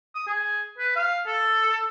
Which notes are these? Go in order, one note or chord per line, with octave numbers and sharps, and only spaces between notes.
D#6
G#4
B4
F5
A4